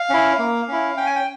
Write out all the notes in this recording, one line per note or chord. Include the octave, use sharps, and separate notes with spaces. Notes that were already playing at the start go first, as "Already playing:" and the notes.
Already playing: F5
C#4 E4
A#3
C#4 E4
C#4 G5
G#5
G5